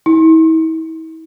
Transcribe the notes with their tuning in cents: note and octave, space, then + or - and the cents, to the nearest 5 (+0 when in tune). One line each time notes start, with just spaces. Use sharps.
E4 -40